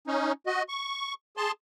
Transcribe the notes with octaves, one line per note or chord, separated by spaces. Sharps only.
C#4 D#4
F#4 D#5
C#6
G#4 A5 C6